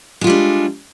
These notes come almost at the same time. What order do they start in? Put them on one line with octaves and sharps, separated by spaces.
G#3 F4 G3 D4